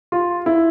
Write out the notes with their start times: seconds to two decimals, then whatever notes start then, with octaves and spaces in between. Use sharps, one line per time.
0.12 F4
0.46 E4